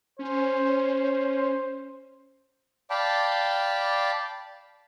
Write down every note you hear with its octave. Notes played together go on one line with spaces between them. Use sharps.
C#4 C5
D5 F5 G5 A5 B5